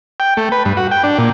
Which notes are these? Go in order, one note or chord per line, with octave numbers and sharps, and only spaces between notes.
G5
A3
B4
G2
F#4
G5
D4
A#2